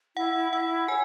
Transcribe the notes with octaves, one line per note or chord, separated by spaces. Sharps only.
E4 F#5
E4 F#5
C#5 G#5